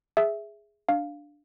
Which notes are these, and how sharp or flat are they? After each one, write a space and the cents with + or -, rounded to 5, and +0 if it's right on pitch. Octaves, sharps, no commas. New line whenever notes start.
G#4 +0 E5 +0
D4 +0 F5 +0